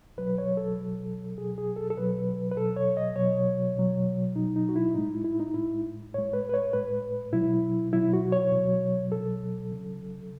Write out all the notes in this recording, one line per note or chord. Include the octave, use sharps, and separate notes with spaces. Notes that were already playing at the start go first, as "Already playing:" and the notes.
B2 F#3 B4
C#5
A4
B2 F#3
B2 F#3 G#4
G#4
A4
A4
B2 F#3 B4
B4
B2 F#3 A4
C#5
D#5
B2 F#3 C#5
B2 F#3
B2 F#3 D#4
D#4
F#4
E4
A2 G#3 D#4
E4
E4
D#4
A2 G#3 E4
A2 G#3 C#5
B4
B4
C#5
A2 G#3 B4
B2 F#3 E4
B2 F#3 E4
F#4
C#5
B2
F#3
B2 F#3 A4
C#3 F#3